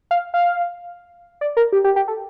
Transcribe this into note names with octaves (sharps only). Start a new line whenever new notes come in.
F5
F5
D5
A#4
G4
G4
G4
A4